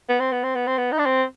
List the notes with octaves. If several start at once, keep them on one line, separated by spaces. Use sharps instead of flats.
B3
C4
B3
C4
B3
C4
B3
D#4
D4
C4